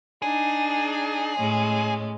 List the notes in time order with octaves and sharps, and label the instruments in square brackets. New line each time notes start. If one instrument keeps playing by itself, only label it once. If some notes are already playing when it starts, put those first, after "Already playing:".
[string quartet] D4 D#4 [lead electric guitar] G#4
[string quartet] A2 G#3 C#4